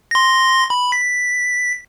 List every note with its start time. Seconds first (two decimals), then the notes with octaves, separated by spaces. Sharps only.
0.11 C6 A#6
0.70 B5
0.92 B6